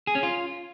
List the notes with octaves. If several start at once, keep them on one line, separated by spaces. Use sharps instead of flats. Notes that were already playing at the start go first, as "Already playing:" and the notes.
G#4
C#4
F4